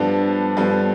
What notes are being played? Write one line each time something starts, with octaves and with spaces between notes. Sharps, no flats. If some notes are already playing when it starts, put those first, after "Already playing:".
Already playing: G2 F3 B3 D4 A4
G2 F3 B3 D4 A4